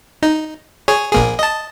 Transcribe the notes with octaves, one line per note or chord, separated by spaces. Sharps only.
D#4
G#4 C#5
A#1 A#3 G#4
D#5 A5